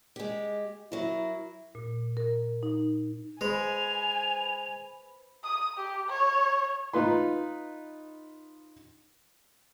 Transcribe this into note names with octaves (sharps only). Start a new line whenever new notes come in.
G#3 G4
F#3 E4 A#4
A#2
A#4
D#4
G#3 B4 C5 G#5 B5 F7
D#6
G4
C#5
D#4 F4 B4 C6